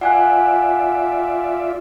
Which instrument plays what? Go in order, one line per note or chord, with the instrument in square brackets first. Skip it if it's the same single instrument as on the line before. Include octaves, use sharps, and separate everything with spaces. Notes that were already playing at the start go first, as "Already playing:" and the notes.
[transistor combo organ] F4 D5 E5 [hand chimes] F#5 G#5 F#6